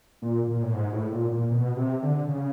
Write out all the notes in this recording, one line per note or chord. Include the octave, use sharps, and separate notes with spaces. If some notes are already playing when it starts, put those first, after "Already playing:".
A#2
A#2
A2
G#2
A2
A#2
A#2
B2
C3
D3
C#3